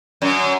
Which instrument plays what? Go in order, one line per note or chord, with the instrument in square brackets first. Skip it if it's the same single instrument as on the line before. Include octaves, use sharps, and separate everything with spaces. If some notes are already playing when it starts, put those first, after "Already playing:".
[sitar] F#2